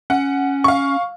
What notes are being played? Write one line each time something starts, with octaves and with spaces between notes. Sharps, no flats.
C#4 F#5
F5 C#6